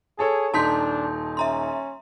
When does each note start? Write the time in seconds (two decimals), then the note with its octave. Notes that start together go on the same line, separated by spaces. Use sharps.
0.19 G#4 A4 C#5 A5
0.54 D#1 D4 D#4 A5 C6 G6 B6
1.37 C#4 E5 A#5 C6